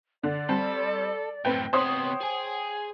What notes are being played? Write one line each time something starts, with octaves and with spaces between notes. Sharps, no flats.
D3 D5
G3 C4 A4
F#2 A2 C4 B4 G5
C3 B3 C5 C#5 G5 D#6
G#4 G#5